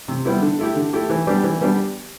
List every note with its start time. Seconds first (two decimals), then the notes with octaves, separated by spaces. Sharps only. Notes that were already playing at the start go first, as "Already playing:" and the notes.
0.08 C3
0.25 G3 B3 E4 G4
0.42 D3
0.59 A3 E4 G4
0.76 D3
0.93 A3 E4 G4
1.10 E3
1.27 G3 B3 D4 G4
1.44 E3
1.61 G3 B3 D4 G4